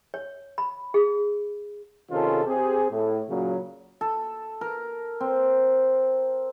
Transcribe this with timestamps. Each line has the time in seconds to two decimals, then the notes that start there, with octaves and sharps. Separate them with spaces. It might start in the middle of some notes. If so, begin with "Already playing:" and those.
0.14 C#5
0.58 B5
0.94 G#4
2.11 C3 D#3 C#4 F4 G#4 A4
2.46 C4 G4 G#4
2.91 A2
3.29 A#2 C#3 F#3
4.01 A4
4.61 A#4
5.20 C4